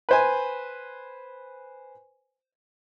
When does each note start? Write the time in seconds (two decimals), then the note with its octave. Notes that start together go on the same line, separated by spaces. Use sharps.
0.09 B4 C5 G#5